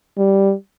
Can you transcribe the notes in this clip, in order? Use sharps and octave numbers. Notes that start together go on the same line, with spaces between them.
G3